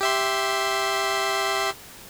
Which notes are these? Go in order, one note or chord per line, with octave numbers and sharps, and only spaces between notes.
G4 E5 C6